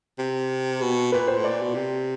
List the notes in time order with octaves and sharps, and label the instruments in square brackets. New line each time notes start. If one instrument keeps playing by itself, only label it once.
[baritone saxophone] C3
B2
[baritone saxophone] A#2 [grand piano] B4
[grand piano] C5
[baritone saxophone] A2
[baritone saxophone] A#2 [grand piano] D5
[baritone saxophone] B2
C3